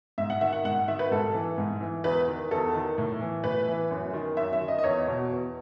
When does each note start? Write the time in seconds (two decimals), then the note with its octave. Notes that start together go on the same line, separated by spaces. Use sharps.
0.18 G#2 E5
0.30 F#5
0.41 D#3 E5
0.53 F#5
0.65 G#2 F#5
0.88 D#3 E5
0.99 B4
1.11 G#2 A4
1.34 E3
1.58 G#2
1.81 E3
2.04 E2 B4
2.28 D#3
2.51 E2 A4
2.74 D#3
2.98 A2
3.21 E3
3.44 A2 B4
3.68 E3
3.90 F#2
4.13 D#3
4.37 F#2 E5
4.53 E5
4.61 D#3
4.68 D#5
4.78 D#5
4.83 E2 C#5
5.07 B2
5.31 E2